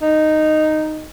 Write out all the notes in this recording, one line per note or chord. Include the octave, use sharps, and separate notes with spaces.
D#4